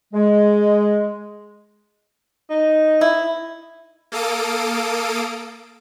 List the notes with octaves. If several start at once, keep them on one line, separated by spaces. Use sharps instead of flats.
G#3
D#4
E4
A#3 A4 F5 D#6 D7